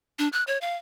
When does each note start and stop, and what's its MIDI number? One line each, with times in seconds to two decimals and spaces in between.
0.19 0.28 62
0.33 0.43 90
0.47 0.58 73
0.61 0.76 77